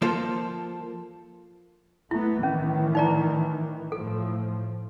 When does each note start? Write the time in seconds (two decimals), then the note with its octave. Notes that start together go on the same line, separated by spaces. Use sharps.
0.02 F3 A#3 F4 A4 C5
2.11 A3 B3 E4
2.43 A2 D#3 E3 C#4
2.95 D#4 D5 A#5
3.92 A2 F3 A4